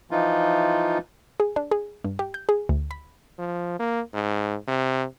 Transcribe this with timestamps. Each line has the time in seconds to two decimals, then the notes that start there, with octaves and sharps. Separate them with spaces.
0.11 E3 F3 D#4 F4
1.40 G#4
1.56 D4
1.71 G#4
2.05 G2
2.19 G4
2.34 G6
2.49 G#4
2.69 D2
2.91 B5
3.39 F3
3.79 A#3
4.14 G#2
4.68 C3